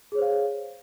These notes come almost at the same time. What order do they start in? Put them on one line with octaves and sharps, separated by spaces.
G#4 C#5 C5 F5